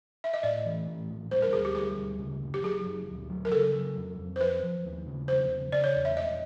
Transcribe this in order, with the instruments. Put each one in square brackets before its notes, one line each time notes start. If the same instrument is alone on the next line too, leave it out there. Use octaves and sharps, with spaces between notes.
[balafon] E5
D#5
[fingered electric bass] A2 [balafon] D5
[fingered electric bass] E3
A2
A#1
[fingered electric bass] G3 [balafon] C5
[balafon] A#4
[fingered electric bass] D2 [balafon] G#4
[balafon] G4
[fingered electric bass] G3 [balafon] G#4
[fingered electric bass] D2
C#3
F#1
[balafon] G4
[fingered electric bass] F#3 [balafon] G#4
[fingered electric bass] F#1
D2
F#3
[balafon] A#4
[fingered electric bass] C#3 [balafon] A4
[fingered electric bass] F#3
F2
F2
[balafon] C5
[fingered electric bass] F3 [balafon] B4
[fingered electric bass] F3
D#2
C#3
[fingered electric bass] E1 [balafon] C5
[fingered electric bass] C#3
[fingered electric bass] C#3 [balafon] D5
[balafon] C#5
[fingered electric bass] E2
[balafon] E5
[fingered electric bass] F1 [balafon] D#5